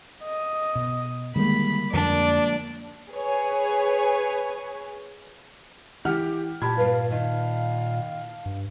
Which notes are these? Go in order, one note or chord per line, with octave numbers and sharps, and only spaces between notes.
D#5
B2
D3 D#3 G3 G#3 A#3 B5
F2 D3 F3 A#3 D4 D5
G#4 B4 C#5 G#5
E3 G4 F#5 F6
A#2 G4 A5 B5 G#6
G2 B4 F5
D#3 F5
G2